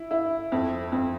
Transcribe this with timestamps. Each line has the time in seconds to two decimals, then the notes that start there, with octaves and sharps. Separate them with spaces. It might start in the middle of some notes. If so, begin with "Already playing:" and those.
Already playing: E4
0.11 E4
0.52 F2
0.92 F2